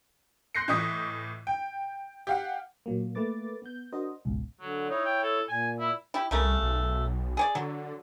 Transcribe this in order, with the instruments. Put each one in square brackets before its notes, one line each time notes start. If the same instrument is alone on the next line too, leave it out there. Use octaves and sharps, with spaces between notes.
[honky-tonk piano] C6 F#6 G6 A#6 C7 C#7
A2 E3 D#5 C#6 D#6 B6
G5
G4 F5 F#5
[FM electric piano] A#2 F#3 A#3
A3 A#3 B4 D6 A6
B3 G6
D4 F#4 A#4 C5 D#5
G#1 C#2 B2
[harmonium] D3 [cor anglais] F#3
[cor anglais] D#4 [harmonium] E4 C#5
[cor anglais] G5
A4
[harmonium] A#2 [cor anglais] G#5
[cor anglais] E4
[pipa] E4 G4
[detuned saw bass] C2 [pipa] C#3 A3 A#4
[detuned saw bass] B1
[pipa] G#4 C#5 D5
[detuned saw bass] D3 [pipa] F#3